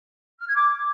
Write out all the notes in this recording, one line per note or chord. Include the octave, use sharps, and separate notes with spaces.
F6
G#6
D6